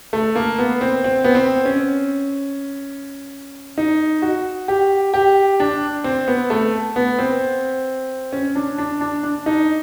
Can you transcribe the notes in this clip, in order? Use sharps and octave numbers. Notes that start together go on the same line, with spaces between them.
A3
A#3
B3
C4
C4
B3
C4
C#4
D#4
F#4
G4
G4
D4
C4
B3
A3
B3
C4
C#4
D4
D4
D4
D4
D#4